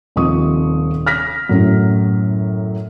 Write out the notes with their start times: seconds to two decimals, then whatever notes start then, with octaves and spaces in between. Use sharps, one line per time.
0.16 D#1 C3 D#3 F3 C#6 D#6
1.06 F6 A#6 B6
1.49 F#2 A2 F#3